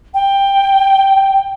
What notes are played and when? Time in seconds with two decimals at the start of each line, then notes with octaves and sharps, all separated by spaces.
0.14 G5